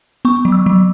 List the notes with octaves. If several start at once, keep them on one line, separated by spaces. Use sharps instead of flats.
B3 C#6
F#3
E6
F#3